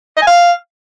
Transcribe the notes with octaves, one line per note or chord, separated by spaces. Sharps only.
D#5
G#5
F5